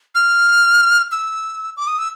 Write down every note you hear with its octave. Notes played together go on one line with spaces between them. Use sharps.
F6
E6
D6
D#6
E6